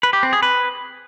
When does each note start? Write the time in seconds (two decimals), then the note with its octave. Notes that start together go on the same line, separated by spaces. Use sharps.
0.03 B4
0.13 G4
0.23 C4
0.33 G#4
0.43 B4